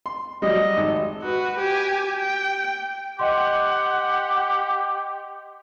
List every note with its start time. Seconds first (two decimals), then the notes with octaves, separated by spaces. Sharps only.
0.06 C6
0.42 F#3 G3 D#5
0.77 G#1
1.22 F#4 B4
1.59 G4 G#5
2.18 G5
3.19 G4 D#5 F#5 C6